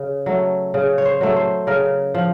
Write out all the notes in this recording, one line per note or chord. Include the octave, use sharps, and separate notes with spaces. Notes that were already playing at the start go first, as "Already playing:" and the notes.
Already playing: C#3
F#3 A3
C#3
C#5
C5
F#3 A3
C5
C#3 A#4
F3